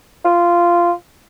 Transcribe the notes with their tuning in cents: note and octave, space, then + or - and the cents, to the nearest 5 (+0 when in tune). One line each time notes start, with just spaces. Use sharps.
F4 -10